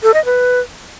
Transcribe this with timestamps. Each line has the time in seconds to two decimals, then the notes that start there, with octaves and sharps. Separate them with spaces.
0.03 A4
0.14 D#5
0.25 B4